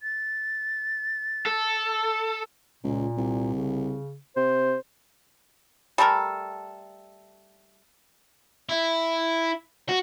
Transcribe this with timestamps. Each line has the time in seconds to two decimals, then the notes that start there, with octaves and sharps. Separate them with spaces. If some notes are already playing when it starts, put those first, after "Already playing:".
0.03 A6
1.46 A4
2.83 C#2 A#2
3.17 C2
3.55 C#3
4.36 C3 C5
5.98 G3 A3 A4 A#4
8.69 E4
9.89 F#4